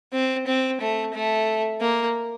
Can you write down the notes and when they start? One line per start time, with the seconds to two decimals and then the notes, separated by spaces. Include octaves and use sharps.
0.13 C4
0.47 C4
0.81 A3
1.14 A3
1.81 A#3